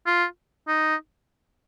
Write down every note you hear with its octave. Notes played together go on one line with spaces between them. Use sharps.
F4
D#4